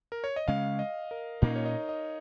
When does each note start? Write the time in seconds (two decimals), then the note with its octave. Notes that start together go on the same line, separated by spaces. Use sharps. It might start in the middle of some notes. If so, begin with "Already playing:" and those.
0.12 A#4
0.24 C#5
0.36 D#5
0.48 C#3 G#3 C#4 F5
0.79 D#5
1.11 A#4
1.42 A#2 A#3 C#4 D#4
1.56 C#5
1.66 D#5
1.89 D#5